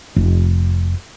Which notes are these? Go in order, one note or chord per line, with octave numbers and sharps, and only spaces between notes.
F1